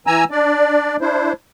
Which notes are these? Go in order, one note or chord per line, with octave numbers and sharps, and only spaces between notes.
E3 G#5 A#5 E6
D4 D5
D4 E4 C5